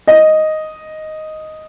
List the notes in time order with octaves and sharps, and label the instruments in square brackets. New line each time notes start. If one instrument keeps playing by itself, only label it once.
[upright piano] D#5